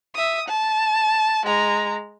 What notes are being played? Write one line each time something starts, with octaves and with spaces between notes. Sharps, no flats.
E5 D#6
A5
G#3 A#5